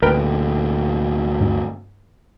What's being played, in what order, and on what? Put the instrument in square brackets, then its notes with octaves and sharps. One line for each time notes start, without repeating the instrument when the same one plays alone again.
[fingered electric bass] D2 A#2 [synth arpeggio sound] A#4 B4 G5
[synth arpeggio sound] G2